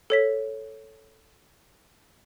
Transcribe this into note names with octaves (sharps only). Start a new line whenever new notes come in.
A4 C#5 B6